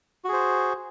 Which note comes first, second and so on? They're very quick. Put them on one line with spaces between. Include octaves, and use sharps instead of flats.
F#4 G#4 C5